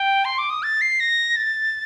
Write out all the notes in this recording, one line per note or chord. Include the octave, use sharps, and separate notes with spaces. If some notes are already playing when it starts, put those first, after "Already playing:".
Already playing: G5
C6
D6
D#6
A6
C7
A#6
A6